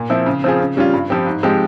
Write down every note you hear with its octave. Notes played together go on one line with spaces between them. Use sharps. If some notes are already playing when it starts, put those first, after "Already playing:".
Already playing: A#2
F3 C4 E4
C#3
F3 C4 F4 G#4
C#3
G3 C#4 F4
G2
F3 C4 G4
G#2
F3 G#3 C4 G4